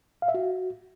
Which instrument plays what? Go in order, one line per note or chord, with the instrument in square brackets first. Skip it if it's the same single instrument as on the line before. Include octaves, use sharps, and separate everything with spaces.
[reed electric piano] F5
E5
F#4